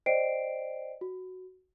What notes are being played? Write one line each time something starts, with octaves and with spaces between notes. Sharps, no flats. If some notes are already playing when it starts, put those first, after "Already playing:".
C5 D5 D#5 G5 C7 D7
F#4